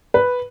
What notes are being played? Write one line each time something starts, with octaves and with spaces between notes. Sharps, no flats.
B4